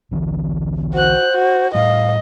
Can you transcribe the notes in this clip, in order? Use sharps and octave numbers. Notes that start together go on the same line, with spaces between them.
B1 D3 E3
F#4 C5 F#6
F#4
A2 G3 D#5 F5